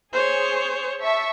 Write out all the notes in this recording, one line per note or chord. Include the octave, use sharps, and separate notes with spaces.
G#4 C5 C#5
E5 A5 C#6